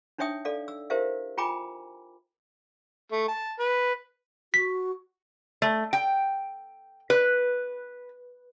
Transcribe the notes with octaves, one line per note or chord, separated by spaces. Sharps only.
D4 D#4 C#5 E5 G5 D#6
A4 D5 F5
E6
E4 G4 A#4 C5 E5 F5
F4 G5 G#5 A#5 B5 D6
A3
A5
B4
F#4 B6
A3
G5
B4